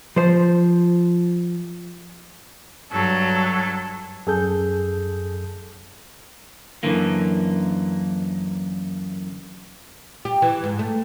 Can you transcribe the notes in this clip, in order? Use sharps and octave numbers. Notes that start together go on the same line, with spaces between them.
F3 C5
G2 F#3 A4
F#2 G#4 A4 G6
F#2 D3 E3 A#3
G4
E3
G#2
A3